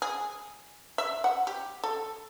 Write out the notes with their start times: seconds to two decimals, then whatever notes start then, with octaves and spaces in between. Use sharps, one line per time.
0.02 G#4
0.98 E5
1.24 F#5
1.47 G4
1.84 A4